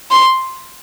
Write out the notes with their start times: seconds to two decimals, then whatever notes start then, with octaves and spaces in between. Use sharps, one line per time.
0.11 C6